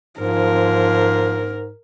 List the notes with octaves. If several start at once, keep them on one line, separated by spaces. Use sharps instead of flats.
G#2 F3 A#4